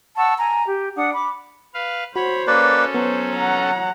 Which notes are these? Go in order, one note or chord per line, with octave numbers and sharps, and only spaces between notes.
F#5 A5 C#6 E6
G#5 A#5
G4
D4 F#5 D#6
B5 D6
B4 F5
F#4 C5 C#5 B5
A#3 C#4 A4 B4 D5
F#3 B3 C5
F#5 A#5